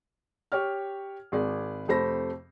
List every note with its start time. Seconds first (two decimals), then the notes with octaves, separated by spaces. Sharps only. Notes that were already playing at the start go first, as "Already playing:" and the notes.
0.52 G4 C#5 F6
1.32 G#1 G#4 D5
1.88 F2 C3 A3 C5 B5 A#6